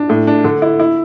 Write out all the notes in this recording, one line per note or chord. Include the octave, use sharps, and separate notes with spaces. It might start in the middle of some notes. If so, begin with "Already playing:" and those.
Already playing: D4
A2
D4
D3
E4
E4